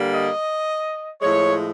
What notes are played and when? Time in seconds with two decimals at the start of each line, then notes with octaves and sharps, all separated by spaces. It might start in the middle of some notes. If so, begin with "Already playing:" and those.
Already playing: D3 G3 A#3
0.13 D#5
1.21 A2 F3 G#3 C#5